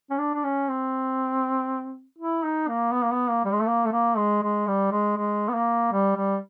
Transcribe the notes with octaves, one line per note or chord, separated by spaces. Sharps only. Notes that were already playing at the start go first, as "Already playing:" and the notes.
C#4
D4
D4
C#4
C4
E4
D#4
A#3
B3
A#3
B3
A#3
G3
G#3
A3
A#3
A3
A#3
G#3
G#3
G3
G#3
G#3
B3
A#3
G3
G3